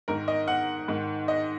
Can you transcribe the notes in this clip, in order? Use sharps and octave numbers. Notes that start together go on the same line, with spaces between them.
G#2 D#3 A#4
D#5
F#5
G#2 D#3
D#5